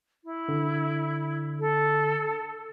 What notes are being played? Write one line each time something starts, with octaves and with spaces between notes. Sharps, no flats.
E4
D3
A4